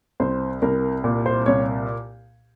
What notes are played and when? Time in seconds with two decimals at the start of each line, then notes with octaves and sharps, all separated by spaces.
0.20 C2 C5
0.62 C2 A#4
1.04 A#2
1.26 C5
1.46 C2 C#5